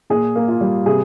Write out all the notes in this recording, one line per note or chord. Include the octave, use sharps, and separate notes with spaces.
A#2 G#4
A#3
F4
G3
C3 G#4